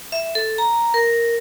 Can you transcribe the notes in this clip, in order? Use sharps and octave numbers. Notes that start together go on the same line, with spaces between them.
E5
A4
A#5
A#4